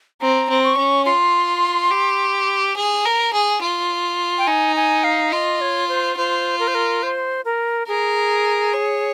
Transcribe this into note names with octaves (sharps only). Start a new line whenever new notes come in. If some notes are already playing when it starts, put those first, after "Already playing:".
C4 A#5
C4
C#6
C#4
F4 C6
G4
G#4
A#4
G#4
F4
G5
D#4 G#5
G#5
F5
F4 D#5
C#5
C5
F4 C5
A#4
C5
A#4
C5
A#4
G#4 A#4
C#5